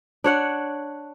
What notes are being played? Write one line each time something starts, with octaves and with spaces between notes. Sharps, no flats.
D4 C#5 F#5